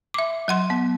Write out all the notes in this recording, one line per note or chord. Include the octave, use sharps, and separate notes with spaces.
E5 D6
F#3 F#5 C6
B3